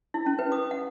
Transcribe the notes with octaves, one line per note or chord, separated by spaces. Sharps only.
E4
C#4
B4
D#6
F#5